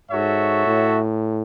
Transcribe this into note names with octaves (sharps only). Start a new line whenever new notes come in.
G#2 F#4 A4 C#5 E5
A2